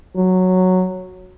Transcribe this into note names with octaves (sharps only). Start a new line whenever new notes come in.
F#3